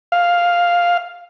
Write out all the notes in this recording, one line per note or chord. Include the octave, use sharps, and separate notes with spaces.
F5